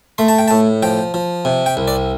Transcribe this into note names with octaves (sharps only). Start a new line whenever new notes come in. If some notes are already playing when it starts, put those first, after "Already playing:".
A3 C6
A5
G5
A2 A5
F3 G5
F3
C3
G5
C2
D5